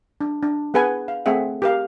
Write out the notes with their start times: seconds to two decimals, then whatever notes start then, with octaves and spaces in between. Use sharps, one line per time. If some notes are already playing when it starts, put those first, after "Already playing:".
0.21 D4
0.43 D4
0.74 B3 G#4 B4 F#5 G#5
1.08 F5
1.26 A3 C4 G#4 E5 F#5
1.62 G4 A#4 F5